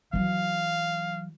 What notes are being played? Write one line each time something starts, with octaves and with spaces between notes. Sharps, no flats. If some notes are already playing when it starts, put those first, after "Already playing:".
E3 F#3 F5